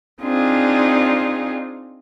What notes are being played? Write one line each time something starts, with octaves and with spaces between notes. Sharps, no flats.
C4 D4 D#4 F4 G#4